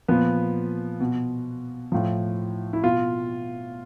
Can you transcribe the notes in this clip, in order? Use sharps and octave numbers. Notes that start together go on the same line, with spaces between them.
A#2 F3 B3
B2
A2 F3
E4
B2 F4